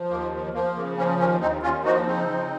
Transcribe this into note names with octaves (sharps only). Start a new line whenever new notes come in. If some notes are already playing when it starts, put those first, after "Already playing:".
Already playing: F3
D#2 A#3
F3
F3 A#3
C#3 A#3
F3 A#3 C#4
D#2 A#3 C#4
D#2 C4 D#4
D#2 C#4 F4
F3 D#4 F#4
C#3 C4 D#4
F3